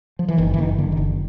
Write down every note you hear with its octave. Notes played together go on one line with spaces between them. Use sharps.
F3
E3
F#1 D#3
E3
F#1 D#3
F#1 D3
D#3
F#1 D3